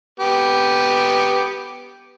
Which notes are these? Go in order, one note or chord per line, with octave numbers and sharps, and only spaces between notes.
B3 G4